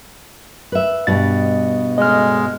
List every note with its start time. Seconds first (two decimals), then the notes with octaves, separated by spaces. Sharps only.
0.72 B4 E5
1.07 G2 B2 G3 D#5 A6
1.98 D2 C#3 G#3 D#5 F6